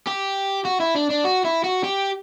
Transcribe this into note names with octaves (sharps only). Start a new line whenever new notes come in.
G4
F#4
E4
D4
D4
F#4
E4
F#4
G4